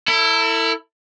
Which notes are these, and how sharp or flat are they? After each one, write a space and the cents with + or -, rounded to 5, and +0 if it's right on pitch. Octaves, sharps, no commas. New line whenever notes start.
E4 +0 A4 +40